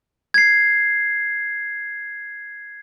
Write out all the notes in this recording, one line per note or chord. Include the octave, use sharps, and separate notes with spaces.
G#6 C7